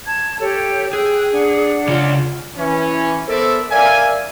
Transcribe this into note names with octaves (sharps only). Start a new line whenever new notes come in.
A5 G#6
G4 A4 C#5
G#4 G5 E6 F#6
D4 F#5
C#3 F4
E3 C#4
B3 A4 A#4 C5 D5 E5
A#4 D5 E5 F5 G#5